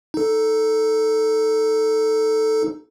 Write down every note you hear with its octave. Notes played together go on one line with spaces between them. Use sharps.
D#4 A4